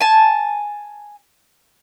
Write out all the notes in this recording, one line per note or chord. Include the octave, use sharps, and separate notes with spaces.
G#5 A5